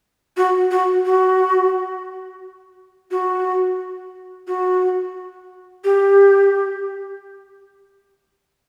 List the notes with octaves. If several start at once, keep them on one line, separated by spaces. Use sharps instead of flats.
F#4
F#4
F#4
F#4
F#4
G4